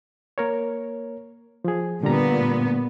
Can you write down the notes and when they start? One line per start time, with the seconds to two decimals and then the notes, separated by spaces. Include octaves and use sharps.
0.38 A#3 A#4 C#5
1.65 F3 G#4
2.03 A#2 D3 G3 B3 A#5